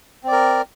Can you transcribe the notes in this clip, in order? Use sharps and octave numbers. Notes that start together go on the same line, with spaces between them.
C4 A#4 D5